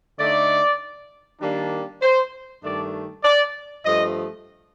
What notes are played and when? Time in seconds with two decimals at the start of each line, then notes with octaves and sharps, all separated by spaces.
0.18 D3 A3 D#4 D5
1.41 D#3 G3 A#3 D4
2.02 C5
2.63 G2 D#3 A3 D4 D5
3.24 D5
3.85 G2 F3 A3 D#5